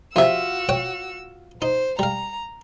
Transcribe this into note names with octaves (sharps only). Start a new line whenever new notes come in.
F2 C3 F4 F#4 E5 E6
C#5 F#5 G5
D#4 C5
G3 F5 A#5